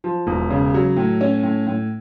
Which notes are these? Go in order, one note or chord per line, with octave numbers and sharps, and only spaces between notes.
F3
E1
C#3
F#3
A2
C#4
A2
A2